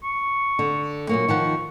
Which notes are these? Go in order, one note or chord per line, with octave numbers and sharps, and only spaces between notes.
C#6
D3
A#2 F#3 A#3 C#6
D#3 F3 F#5